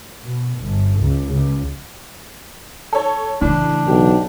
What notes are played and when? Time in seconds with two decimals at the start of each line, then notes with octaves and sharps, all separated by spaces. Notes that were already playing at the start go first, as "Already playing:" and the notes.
0.23 B2
0.60 G1
1.01 C#2
1.32 C#2
2.93 A4 C#5
3.41 A2 C#3 E3 D4
3.88 B1 G4